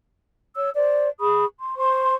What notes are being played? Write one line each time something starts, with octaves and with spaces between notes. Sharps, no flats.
C#5 E6
C5 D5
G#4 B5 C#6 D#6
C6
C5 C6 C#6